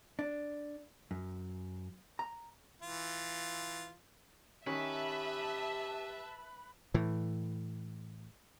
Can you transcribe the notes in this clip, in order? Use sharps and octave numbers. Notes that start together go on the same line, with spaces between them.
D4
F#2
A#5
E3 F4
D#3 C#4 G4 B4 E5 A5
A2 E3